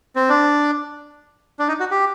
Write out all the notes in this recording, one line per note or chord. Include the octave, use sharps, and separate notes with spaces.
C4
D4
D4
D#4
F#4
G4